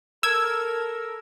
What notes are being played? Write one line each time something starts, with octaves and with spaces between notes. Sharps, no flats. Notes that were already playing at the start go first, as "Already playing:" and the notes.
A4 A#4 E6 G#6